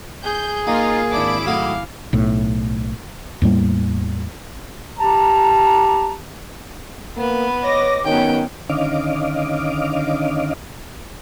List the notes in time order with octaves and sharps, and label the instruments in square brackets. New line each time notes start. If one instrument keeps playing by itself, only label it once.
[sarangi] G#4 [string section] G6
[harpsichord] A#3 [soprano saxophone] D#4 [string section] F4
[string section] G#1 E4 D6 [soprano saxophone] D4
[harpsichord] F#3 A3 D#5 [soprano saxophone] F5
[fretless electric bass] B1 A2
E2 A2 G3 A#3
[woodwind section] G4 A5 A#5
[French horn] A#3 [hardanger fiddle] B3 B4
[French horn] C#5 [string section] D#5 D6 A#6
[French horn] D#3 [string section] F#3 B3 C#4 [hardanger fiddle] G5
[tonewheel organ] D3 D#3 C#4 D#5 F5 D6